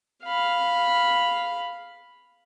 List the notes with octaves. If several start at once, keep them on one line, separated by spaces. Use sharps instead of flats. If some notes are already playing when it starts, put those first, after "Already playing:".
F5 B5